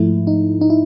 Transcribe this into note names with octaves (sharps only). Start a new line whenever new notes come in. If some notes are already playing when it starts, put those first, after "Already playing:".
Already playing: G#2 F3 A3 E4
D#4
D#4
E4